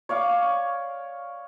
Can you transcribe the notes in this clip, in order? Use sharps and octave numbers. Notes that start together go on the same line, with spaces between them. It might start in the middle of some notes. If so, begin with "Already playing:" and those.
C#5 D5 F5 D6